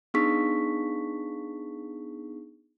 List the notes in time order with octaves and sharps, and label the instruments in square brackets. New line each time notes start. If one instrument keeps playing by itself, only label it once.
[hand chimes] B3 D4 D#4 G#4 C#6 B6